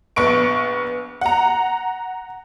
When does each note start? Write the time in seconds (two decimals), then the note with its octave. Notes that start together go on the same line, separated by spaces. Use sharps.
0.16 A#1 B3 C#6 D7
1.21 F#5 A#5